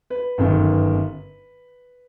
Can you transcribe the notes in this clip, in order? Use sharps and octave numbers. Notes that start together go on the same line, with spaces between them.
B4
G1 F#2 D#3